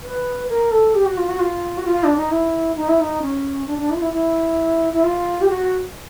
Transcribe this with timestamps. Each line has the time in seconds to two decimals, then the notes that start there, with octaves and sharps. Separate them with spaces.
0.03 B4
0.49 A#4
0.72 A4
0.94 G4
1.06 F#4
1.17 F4
1.29 F#4
1.39 F4
1.77 F#4
1.85 F4
2.04 D4
2.17 D#4
2.31 E4
2.76 D#4
2.88 E4
3.00 D#4
3.22 C#4
3.67 D4
3.78 D4
3.90 E4
3.95 F4
4.01 E4
4.13 E4
4.93 E4
5.04 F4
5.41 G4
5.49 F#4